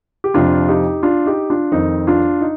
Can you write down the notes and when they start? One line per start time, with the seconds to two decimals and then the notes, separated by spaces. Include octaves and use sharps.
0.24 G4
0.34 F2 C3 F3 D4 F4
0.68 D#4 G4
1.03 D4 F4
1.26 D#4 G4
1.50 D4 F4
1.72 F2 D#3 C4 D#4
2.07 D4 F4
2.41 D#4